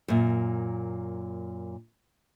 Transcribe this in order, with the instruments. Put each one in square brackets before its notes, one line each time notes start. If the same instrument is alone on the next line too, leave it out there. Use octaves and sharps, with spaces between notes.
[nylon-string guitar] F#2 A#2